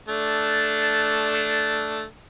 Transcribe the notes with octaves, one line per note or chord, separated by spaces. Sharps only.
A3 D4